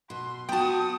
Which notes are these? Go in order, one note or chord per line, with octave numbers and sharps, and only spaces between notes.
B2 C6
B3 F#4 G5 A5 D#6